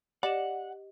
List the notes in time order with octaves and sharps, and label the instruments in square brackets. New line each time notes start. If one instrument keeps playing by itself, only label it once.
[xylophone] G4 D#5 E7 [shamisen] D5 [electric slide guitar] F#5